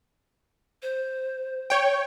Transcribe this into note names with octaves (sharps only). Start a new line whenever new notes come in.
C5
C#5 G5